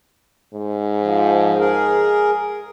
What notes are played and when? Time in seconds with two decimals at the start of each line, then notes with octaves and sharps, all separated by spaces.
0.54 G#2
1.02 F3
1.58 G#4 A#4